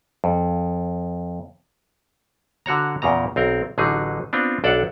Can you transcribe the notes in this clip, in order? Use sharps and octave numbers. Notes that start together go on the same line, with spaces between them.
F2
D3 F#4 C#5 A#5
E2 A#2 C#3 A#5
B1 C4 A#4
A1 D3 F#3 D#4 G#4
B3 C4 D4 F4
B1 D4 A4 D5 F#5